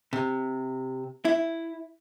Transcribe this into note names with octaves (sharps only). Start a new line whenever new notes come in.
C3
E4